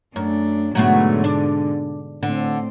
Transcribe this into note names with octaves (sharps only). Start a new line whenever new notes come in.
F#2 A3 D4
G#2 B2 D3 F#3 A3 B3
D4
A2 D3 C4